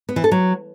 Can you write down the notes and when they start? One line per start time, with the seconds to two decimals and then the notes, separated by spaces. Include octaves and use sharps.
0.09 B3
0.16 E3
0.24 A4
0.32 F#3